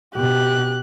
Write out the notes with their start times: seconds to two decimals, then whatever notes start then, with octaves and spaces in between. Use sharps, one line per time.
0.15 B2 G4 F#6